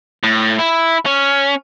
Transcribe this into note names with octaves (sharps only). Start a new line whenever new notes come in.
A2
E4
C#4